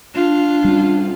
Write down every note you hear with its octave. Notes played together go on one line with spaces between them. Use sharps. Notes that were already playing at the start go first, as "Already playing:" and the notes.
D4 F4
G3 C#4